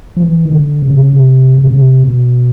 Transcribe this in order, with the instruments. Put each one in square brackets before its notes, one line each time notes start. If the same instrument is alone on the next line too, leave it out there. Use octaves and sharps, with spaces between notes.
[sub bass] F3
E3
D#3
D3
C#3
C3
C#3
C3
C3
C#3
C3
B2